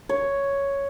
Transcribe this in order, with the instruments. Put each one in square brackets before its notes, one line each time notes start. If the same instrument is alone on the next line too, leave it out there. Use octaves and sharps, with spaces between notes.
[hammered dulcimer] C#5